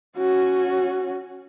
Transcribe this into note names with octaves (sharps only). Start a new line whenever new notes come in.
C#4 F#4